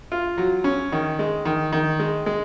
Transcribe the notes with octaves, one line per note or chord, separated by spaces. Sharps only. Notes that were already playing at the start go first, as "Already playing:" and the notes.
F4
F#3
C#4
D#3
G#3
D#3
D#3
G#3
G#3